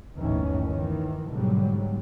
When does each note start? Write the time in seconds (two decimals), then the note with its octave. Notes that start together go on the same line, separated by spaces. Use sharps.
0.18 G1 D#2 A2 D#3 E3 C#4
0.66 D#3 E3
1.28 G#2 B2 D3 F#3 G3